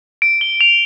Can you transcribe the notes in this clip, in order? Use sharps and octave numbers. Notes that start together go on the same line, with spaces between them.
D7
G7
F7